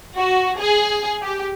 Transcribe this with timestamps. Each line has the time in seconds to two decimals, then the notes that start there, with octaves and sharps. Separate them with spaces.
0.17 F#4
0.59 G#4
1.22 G4